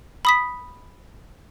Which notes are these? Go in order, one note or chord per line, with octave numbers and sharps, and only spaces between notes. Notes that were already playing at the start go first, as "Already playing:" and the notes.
B5 D#6 B6